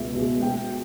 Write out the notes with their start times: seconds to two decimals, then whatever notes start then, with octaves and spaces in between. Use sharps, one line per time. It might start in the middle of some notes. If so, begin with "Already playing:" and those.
Already playing: C#2 B2 G#3 E5
0.14 B2 G#3
0.41 B2 G5